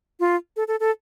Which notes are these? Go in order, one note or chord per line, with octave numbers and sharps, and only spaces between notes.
F4
A4
A4
A4